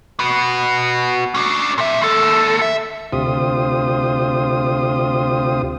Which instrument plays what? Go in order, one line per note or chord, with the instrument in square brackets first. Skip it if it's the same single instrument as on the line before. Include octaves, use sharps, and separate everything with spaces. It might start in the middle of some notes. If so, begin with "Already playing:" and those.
[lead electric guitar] F#4 B4
C#4 D4
A#2 E5
D#2 A4
E5
[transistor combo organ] D2 C3 F4 G4 C5 D#6